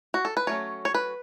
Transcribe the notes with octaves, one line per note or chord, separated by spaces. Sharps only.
F#4
A4
B4
F#3 A3 C#4 C#5
C#5
B4